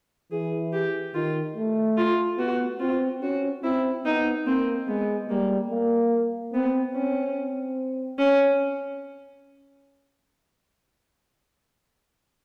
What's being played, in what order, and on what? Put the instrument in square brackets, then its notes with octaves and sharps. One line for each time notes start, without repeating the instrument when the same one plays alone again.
[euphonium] E3 [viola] G#4
[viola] G4
[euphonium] D#3 [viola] F4
[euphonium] A3
[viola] F4
[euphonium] B3 [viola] F#4
[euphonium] C4 [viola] F4
[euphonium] C#4 [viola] F#4
[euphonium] C4 [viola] E4
[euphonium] B3 [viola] D#4
[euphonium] A#3 [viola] C4
[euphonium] G#3 [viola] B3
[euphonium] G3 [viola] A#3
[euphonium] A#3
[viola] B3 [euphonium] C4
[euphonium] C4 [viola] C#4
[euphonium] C4
[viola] C#4